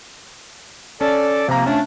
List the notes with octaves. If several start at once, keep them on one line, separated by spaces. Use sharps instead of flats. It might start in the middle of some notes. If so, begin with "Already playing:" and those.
C#4 A4 D5
C3 F3 A#3 A#5
F3 A3 C#4 D4